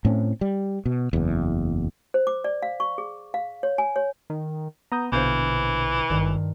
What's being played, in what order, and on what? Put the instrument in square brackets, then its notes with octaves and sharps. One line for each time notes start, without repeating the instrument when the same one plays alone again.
[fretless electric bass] A2 C4 C#4
G3
B2
F#1 E2
[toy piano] C5
D6
D5
F5
C#6
G#4
F5
C#5
G#5
C#5
[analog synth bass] D#3
[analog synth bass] B3 [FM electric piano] A#5 D#6 G6
[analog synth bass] A#1 [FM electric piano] B2 D3 [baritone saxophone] E3 [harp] C5 F5 G6
[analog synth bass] G#1 [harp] G2 D#3